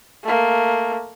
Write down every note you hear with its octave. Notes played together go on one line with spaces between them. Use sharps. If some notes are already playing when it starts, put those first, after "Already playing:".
A3 A#3